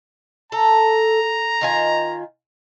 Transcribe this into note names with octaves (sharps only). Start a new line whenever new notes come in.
A4 A#5
D#3 F4 G#5